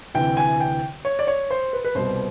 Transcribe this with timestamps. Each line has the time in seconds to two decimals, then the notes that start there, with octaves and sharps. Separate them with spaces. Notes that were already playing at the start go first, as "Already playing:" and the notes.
0.15 D2 C3 E3 G5
0.37 G#5
0.60 G5
1.05 C#5
1.19 D5
1.27 C#5
1.50 C5
1.73 B4
1.85 B4
1.95 C2 B2 G3 B3 C5